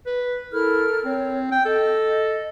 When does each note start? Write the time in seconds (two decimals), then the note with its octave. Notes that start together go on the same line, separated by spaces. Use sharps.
0.06 B4
0.52 E4 A4 A#4 F6
1.05 C4 C#5
1.52 G5
1.66 A4 D#5